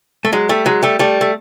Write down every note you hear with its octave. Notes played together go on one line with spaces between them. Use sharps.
A3
F#3 G#3
G3 A3
F#3 G#3
G3 A3
G3 A3
A3